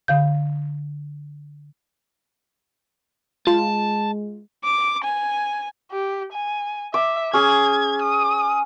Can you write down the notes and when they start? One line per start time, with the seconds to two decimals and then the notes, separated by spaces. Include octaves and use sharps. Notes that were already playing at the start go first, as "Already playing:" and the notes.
0.08 D3 F5 G6
3.47 G#3 F4 A5
4.63 D6
5.03 G#5
5.92 G4
6.33 G#5
6.94 E5 D6
7.33 C#4 G#4 G#6
8.02 D#6